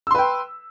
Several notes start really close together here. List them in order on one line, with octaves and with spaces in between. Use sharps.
E6 C6 B4 G5